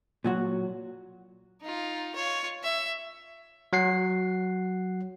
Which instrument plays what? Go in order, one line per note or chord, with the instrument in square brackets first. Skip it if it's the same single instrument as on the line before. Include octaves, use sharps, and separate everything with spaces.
[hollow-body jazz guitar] A#2 F#3 F#4
[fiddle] D#4 F4
F4 C#5
E5
[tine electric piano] F#3 F#5 C7